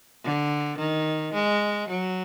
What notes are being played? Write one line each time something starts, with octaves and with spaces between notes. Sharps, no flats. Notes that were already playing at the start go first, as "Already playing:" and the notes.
D3
D#3
G#3
F#3